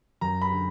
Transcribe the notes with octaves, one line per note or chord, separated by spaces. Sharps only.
F#2 A#5
B5
D3